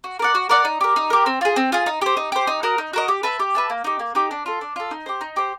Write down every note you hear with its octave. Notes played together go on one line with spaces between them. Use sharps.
F#4
A#4 D5 F#5
F#4
A#4 D5 F#5
D#4
G4 A#4
D#4
G4 A#4
C4
F4 G#4
C4
F4 G#4
D#4
G4 C5
D#4
G4 C5
D#4
F#4 A#4 D#5
D#4
F#4 A#4 D#5
G4
B4 E5 A5
G4
B4 E5 A5
A#3
D#4 G4
A#3
D#4 G4
D4
F4 A4
D4
F4 A4
D#4
G4 C5
D#4
G4 C5